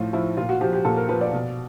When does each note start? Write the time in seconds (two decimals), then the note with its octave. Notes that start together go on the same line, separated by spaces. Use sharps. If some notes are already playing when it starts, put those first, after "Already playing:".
Already playing: A2 F3 F4
0.13 F3 E4
0.37 A#2 F4
0.49 F#4
0.61 F3 G4
0.73 G4
0.85 A#2 A4
0.97 A#4
1.09 F3 B4
1.21 D5
1.33 B2